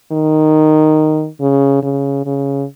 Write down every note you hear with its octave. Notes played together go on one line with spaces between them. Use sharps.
D#3
C#3
C#3
C#3